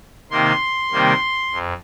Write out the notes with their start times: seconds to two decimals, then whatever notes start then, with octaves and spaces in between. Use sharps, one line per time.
0.31 C3 D#3 A#3 C6
0.92 C3 D#3 G3 A#3
1.52 F2